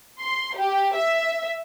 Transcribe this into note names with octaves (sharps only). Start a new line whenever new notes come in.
C6
G4
E5